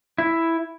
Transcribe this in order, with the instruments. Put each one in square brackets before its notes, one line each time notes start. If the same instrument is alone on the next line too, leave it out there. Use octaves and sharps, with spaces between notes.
[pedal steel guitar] E4